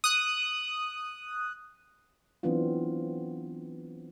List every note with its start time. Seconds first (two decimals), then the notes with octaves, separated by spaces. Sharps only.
0.04 D#6 F#6
2.43 E3 F#3 B3 C4 D4 F4